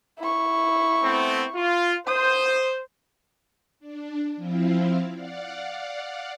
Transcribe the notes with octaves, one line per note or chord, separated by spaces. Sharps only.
E4 C#6
A3 B3 C4
F4
C5 D#6
D4
F3 C4 E4 F4
D5 F5 F#5